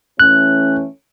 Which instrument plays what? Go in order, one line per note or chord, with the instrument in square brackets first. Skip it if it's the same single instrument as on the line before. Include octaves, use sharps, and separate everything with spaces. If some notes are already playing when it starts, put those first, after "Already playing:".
[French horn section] E3 A3 C#4 [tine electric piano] F#6